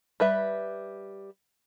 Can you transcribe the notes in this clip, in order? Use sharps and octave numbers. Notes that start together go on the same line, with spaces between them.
G3 B4 E5